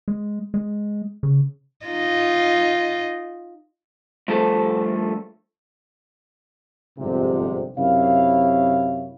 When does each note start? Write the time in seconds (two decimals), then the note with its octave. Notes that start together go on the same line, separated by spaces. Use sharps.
0.08 G#3
0.54 G#3
1.23 C#3
1.86 D#4 F4 D#5
4.28 G2 F3 A3 A4 C5
6.99 G1 F2 G#2 C3
7.78 F#2 C3 E4 C#5 F5